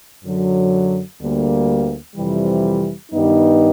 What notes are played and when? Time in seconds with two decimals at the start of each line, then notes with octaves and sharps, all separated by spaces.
0.23 F#2 D3 F#3
1.20 D2 D3 G3 A#3
2.16 F2 C3 E3 G3
3.11 G2 D#3 G3 B3 D#4